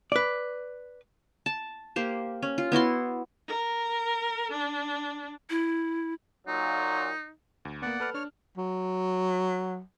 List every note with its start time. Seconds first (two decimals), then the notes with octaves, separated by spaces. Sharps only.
0.12 B4 D5
1.46 A5
1.96 A#3 G4 C5
2.42 C#4
2.58 F4
2.72 B3 E4 F#4 C6
3.47 A#4
4.51 D4
5.50 E4
6.47 A#2 F#3 D#4
7.65 D2
7.82 A#3 B3 D5 F#5
8.00 A4 B4 F6
8.14 D4 C#5 F6
8.57 F#3